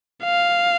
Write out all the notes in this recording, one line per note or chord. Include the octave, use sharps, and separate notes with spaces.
F5